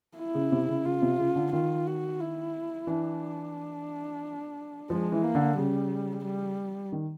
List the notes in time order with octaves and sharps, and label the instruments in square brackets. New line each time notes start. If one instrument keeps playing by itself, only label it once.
[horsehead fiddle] E4
[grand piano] C#3
C3
C#3
[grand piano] C#3 [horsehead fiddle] F4
[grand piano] C3
C#3
D3
[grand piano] D#3 [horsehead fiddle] F4
[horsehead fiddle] F#4
E4
[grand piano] E3 [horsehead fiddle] D4
[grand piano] F3 [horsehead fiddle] G#3
[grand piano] E3
[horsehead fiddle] A#3
[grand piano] D3
[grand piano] C#3 [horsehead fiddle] G3
[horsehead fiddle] G3
[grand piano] D#3